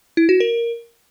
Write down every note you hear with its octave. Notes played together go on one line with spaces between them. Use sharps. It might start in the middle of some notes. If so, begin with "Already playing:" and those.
E4
F#4
A#4